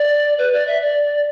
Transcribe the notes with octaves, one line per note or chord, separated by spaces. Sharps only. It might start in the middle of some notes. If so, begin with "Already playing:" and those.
Already playing: D5
B4
D5
E5
D5